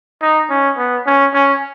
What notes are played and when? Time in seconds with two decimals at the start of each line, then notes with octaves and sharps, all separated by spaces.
0.22 D#4
0.50 C#4
0.78 B3
1.06 C#4
1.34 C#4